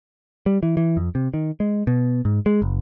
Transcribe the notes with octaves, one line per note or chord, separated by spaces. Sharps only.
G3
E3
E3
F2
C3
D#3
G#3
B2
G#2
G#3
F#1